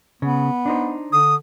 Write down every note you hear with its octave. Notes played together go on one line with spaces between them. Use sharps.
C#3 B3
D4 D#4 C5
D3 D#6